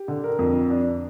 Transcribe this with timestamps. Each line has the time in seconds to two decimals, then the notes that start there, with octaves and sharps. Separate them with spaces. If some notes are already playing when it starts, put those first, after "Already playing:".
Already playing: G4
0.08 D3
0.24 A#4
0.39 F2
0.70 D4